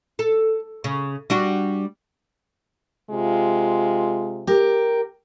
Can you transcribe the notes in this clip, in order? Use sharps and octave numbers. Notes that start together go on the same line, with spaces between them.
A4
C#3
G3 D4 F#4
C3 G#3 F4
G4 A#4